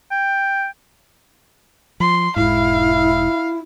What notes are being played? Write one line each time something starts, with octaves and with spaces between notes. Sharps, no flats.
G5
F3 C6
E1 G#2 E4 F5